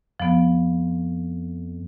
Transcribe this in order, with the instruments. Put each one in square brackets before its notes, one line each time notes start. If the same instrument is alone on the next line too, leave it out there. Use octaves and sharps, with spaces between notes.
[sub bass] F2 [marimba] F3 B3